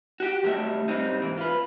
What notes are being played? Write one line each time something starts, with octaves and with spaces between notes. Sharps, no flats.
F#4 G4
C3 D#3 F#3 G3 A3 E5
G#2 C3 G3 C4 D#4
G#2 E3
F4 B4